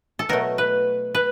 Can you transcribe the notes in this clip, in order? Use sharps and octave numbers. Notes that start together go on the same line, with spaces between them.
A4
B2 F#3 A3 A#4
B4
B4